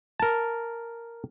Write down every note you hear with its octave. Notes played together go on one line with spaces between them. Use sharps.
A#4 A5